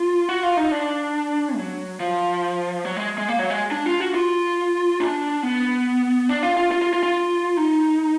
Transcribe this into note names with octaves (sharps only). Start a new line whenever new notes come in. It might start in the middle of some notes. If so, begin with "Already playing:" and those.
Already playing: F4
F#4
F4
D#4
D4
F#3
F3
F#3
G#3
G#3
A#3
F#3
G#3
D4
F4
F#4
F4
D4
B3
D4
F4
F4
F4
F4
F4
F4
D#4